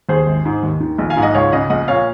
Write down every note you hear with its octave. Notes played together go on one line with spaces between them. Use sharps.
D#2 G#4 C5
G#1
G#2
D#2
D#3
A#1
F5 G#5
G#2
D#5 F#5
C#2 C#5 F5
C#3 D#5 F#5
A#1 D#5 F#5
A#2 C#5 F5